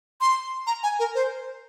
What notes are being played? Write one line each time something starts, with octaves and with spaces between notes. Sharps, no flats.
C6
A#5
G#5
A#4
C5